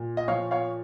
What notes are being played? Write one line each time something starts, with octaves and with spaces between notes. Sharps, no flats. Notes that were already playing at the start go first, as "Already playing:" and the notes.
Already playing: A#2
D#5
F3 C#5 F5
C#5 F5